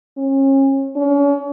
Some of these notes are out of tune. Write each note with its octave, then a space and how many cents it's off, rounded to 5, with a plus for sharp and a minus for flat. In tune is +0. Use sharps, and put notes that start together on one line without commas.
C#4 -35
C#4 +40